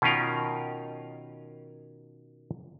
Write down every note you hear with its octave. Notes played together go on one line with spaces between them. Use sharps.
B2 D#3 C#4 F4 A#4